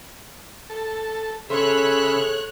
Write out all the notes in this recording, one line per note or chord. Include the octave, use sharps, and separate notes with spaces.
A4
C#3 G#4 A4 C#5 E5 B5 C6 F#6